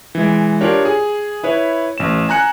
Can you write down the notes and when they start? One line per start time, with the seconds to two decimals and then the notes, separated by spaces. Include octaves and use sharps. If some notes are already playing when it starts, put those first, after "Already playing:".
0.15 E3 G#3
0.61 D4 F4 G4 A#4 C#5
0.85 G#4
1.43 E4 B4 C#5
1.98 A1 E7
2.29 G#5 A#5 F#6 C#7